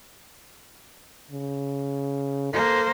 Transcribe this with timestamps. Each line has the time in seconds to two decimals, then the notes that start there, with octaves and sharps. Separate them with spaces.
1.31 C#3
2.53 A#3 A4 C5